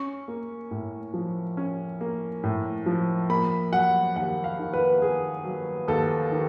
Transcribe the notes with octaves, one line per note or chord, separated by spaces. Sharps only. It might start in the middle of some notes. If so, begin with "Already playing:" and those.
Already playing: C#4 C#6
A#3
A2
F3
C#4
A#3
A2
F3
A#3 B5
F#3 F#5
D#2 F#5
F5
D#3
B4
A#3 G#4
F#3
D#2 A4
D#3